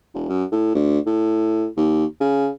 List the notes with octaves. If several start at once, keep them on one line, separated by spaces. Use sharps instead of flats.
E1
F#2
A2
D2
A2
D#2
C#3